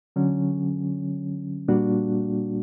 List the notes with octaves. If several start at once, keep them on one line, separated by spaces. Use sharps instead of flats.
D3 F#3 C#4
A#2 G3 A#3 D4 F#4